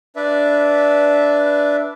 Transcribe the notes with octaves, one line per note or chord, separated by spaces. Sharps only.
D4 B4 D5 E5